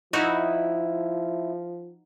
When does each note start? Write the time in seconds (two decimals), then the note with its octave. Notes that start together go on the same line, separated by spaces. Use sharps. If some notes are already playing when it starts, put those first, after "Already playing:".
0.13 F3 D#4 E4 F#4 D#5